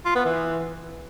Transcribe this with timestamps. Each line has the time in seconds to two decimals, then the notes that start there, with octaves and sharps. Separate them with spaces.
0.05 F4
0.15 B3
0.25 E3